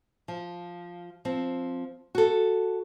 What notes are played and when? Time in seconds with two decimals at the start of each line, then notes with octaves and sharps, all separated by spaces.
0.28 F3
1.25 F3 C4
2.15 F#4 A4